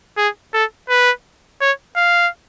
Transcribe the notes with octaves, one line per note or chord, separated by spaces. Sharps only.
G#4
A4
B4
C#5
F5